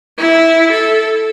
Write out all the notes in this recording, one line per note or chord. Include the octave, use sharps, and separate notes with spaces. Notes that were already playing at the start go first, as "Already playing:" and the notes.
E4
A4